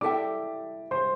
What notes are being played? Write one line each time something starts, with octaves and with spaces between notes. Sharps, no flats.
E4 A4 D5 E5 G5 D6
C5 C6